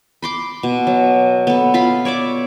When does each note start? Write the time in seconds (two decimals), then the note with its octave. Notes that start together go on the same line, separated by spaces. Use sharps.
0.22 B5 C6 D6
0.63 B2
0.87 F#3
1.47 B3 A4
1.74 F4 F5 B5
2.05 C#5 D5 E5 D6